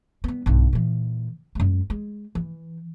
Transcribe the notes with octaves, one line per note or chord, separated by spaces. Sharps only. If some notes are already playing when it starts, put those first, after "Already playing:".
G3 B3
B1 G2
A#2 E3
F#2 G#3
G#3
E3